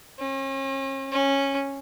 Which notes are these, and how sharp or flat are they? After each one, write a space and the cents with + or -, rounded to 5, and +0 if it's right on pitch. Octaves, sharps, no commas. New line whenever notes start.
C#4 -40
C#4 -10